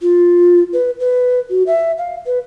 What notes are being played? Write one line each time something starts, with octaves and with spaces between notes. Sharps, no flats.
F4
B4
B4
F#4
E5
F5
B4